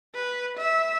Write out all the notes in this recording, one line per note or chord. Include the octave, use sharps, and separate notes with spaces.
B4
E5